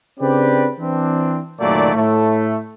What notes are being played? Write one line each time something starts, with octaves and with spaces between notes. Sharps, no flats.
C#3 C4 D4 G4 B4 D5
E3 C4 D4
F#1 A#2 D#3 F#3 A3 D5
A2 A3